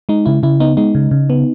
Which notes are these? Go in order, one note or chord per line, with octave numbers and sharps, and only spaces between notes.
G#3 D#4
C#3 E4
C#3 E4
B3 D#4
G#3 D#4
C#3
C#3
B3